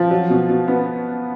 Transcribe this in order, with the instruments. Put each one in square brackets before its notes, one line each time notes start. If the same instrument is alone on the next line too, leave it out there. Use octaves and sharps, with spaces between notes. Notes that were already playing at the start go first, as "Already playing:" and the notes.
Already playing: [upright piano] F3
F#3
B2
B2
B3